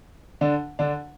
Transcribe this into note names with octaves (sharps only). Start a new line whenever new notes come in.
D3 D4
D3 D4